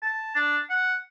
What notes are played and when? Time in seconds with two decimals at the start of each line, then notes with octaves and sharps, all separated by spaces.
0.03 A5
0.35 D4
0.70 F#5